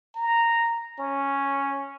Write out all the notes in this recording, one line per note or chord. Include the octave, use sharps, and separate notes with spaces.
A#5
C#4